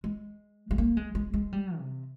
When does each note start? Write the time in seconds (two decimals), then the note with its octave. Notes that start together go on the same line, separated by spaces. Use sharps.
0.04 G#3
0.71 G#3
0.78 A#3
0.97 G#3
1.15 G#3
1.34 G#3
1.53 G3
1.78 C3